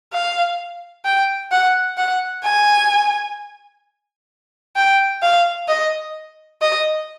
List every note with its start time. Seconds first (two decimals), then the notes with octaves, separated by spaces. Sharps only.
0.13 F5
1.05 G5
1.51 F#5
1.97 F#5
2.44 G#5
4.76 G5
5.22 F5
5.68 D#5
6.61 D#5